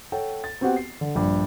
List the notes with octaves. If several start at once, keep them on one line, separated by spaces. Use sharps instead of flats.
A4 C#5 F#5 G5
A6
B3 C4 F#4 G4 F#5 G5
C7
D3
A#1 G2